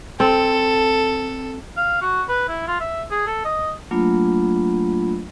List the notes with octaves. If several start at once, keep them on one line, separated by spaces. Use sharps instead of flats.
C4 A4
F5
F#4
B4
E4
F4
E5
G#4
A4
D#5
F#3 A3 A#3 D4 F4 B5